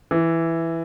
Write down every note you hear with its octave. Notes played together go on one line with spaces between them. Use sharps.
E3